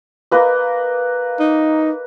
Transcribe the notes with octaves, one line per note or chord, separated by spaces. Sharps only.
A#3 B4 D#5
D#4